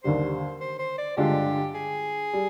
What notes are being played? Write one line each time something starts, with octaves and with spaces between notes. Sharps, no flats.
D#2 D3 G3 C5
C5
C5
D5
G2 D3 G#3 D4 F4 G4
G#4
G3